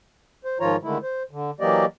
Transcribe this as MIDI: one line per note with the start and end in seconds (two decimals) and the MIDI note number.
0.45 0.58 72
0.60 0.76 44
0.60 0.76 51
0.60 0.76 53
0.60 0.76 65
0.60 0.76 73
0.60 0.76 82
0.83 0.98 50
0.83 0.98 51
0.83 0.98 56
0.83 0.98 57
0.83 0.98 64
1.03 1.23 72
1.31 1.51 50
1.60 1.85 52
1.60 1.85 54
1.60 1.85 58
1.60 1.85 67
1.60 1.85 74
1.60 1.85 75